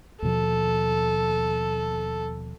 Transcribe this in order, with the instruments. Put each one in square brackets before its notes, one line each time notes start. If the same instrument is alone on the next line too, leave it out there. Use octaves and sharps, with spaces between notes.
[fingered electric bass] D#2 B2 F3 [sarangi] A4